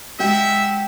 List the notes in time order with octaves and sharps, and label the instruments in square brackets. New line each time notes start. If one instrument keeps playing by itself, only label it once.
[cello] G#3 [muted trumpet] E5 [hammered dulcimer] F#5 G5